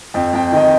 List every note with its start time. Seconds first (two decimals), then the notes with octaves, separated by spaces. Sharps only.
0.14 F2 G5
0.33 F2 G5
0.52 D#3 D#5 G5